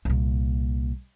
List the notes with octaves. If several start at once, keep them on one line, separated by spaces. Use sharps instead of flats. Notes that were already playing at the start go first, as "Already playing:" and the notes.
C2 A#2